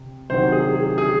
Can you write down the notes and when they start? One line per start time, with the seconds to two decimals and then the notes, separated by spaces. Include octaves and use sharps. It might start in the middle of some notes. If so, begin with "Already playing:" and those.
Already playing: C3
0.30 C3 D#3 F#3 C5
0.52 G#4
0.75 G#4
0.98 G#4